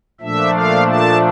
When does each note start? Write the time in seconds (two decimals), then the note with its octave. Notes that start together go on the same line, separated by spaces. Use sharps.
0.20 A#2 F3 A3 D4 E5
0.54 F5
0.88 A5